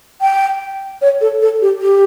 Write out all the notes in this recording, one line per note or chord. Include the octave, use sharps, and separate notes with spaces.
G5
C#5
A4
A4
G4
G4